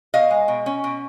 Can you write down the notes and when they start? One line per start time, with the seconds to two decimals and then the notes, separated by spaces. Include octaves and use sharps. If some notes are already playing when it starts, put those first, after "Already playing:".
0.14 B2 D#5 F5
0.31 G#3
0.48 B2
0.66 C#4
0.84 B2